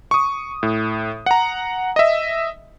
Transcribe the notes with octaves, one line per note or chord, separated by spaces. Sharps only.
C#6 D#6
A2
F#5 A#5
D#5 E5